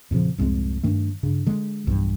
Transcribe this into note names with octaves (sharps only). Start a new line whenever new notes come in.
F2 A#2 C#3 F3
C2 F2 G#2 G#3
G2 D#3 A3
G2 C#3
D3 G#3
B1 E2 G2